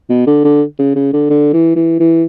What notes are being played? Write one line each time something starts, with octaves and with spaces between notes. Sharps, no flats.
B2
D3
D3
C#3
C#3
D3
D3
E3
E3
E3